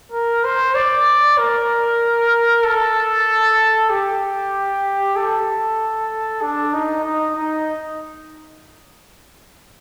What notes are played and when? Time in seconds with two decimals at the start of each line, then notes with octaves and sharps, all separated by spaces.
0.12 A#4
0.44 C5
0.75 D5
1.38 A#4
2.64 A4
3.90 G4
5.16 A4
6.42 D4
6.73 D#4
7.04 D#4
7.36 D#4